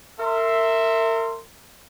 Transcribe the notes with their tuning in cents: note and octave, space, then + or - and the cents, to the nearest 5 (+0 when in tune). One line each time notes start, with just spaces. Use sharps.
A#4 -35 E5 +0 C6 +0